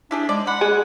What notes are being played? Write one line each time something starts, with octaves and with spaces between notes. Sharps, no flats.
D4 E4 G4 G#4
G#3 D5
F#5 B5
G#3